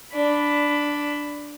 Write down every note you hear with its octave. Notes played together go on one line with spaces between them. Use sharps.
D4 B5